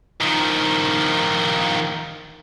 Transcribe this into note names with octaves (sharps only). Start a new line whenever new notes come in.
D#3 F3